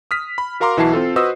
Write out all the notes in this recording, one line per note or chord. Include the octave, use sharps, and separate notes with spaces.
D#6 F6 B6
B5
F#4 A#4 F5 A#5 C6 D6
B1 E3 E4 F#4 A5 C7
C4 F4 A4
F#4 B4 C5 D#5 D#6 E6